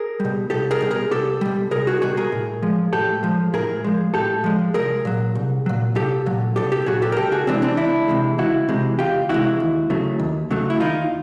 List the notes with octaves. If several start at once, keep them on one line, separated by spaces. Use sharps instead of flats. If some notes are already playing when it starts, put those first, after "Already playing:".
Already playing: G#4 A#4
G3
B2
C2 G4 A4
G#4 A#4
B2 G3
G#4 A#4
C2 G4 A4
B2 G3
C2 G#4 A#4
F#4 G#4
B2 G3 F#4 G#4
G#4 A#4
A2
F3 G#3
A2 G4 A4
F3 G#3
A2 G#4 A#4
F3 G#3
A2 G4 A4
F3 G#3
C2 G#4 A#4
A#2 F#3
C2
A#2 F#3
C2 G4 A4
A#2 F#3
C2 G4 A4
G4 A4
A#2 F#3 F#4 G#4
G4 A4
A#4
C#2 G4 A4
F#4 G#4
C3 E3 G#3 C4 D4
C4 D4
C#2 D4 E4
C3 E3 G#3
C#2 E4 F#4
C3 E3 G#3
C#2 F4 G4
C3 E3 G#3 E4 F#4
D#2
C#3 F#3 A3
D#2
C#3 F#3 A3
E4
D#2 D#4 F4